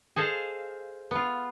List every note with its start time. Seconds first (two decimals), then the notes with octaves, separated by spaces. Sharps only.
0.16 G#4 A4 C5 D#5 F5
1.11 B3 F4